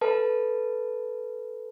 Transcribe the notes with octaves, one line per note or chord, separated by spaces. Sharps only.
A4 B4 A5